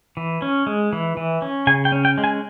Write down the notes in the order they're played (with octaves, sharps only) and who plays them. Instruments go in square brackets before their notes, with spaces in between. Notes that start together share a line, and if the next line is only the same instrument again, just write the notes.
[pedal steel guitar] E3
C#4
G#3
E3
E3
C#4
C#3 G#5
G5
C#4
G5
G#3
G#5